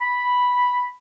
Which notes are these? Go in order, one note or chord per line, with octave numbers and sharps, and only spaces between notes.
B5